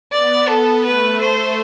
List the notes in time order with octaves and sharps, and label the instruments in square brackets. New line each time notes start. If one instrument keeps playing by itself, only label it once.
[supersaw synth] B3 [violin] D5
[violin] A4
[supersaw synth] A3 [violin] B4
[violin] C5